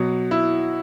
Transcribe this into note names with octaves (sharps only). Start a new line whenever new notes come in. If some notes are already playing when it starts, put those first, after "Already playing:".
Already playing: B2 F#3
E4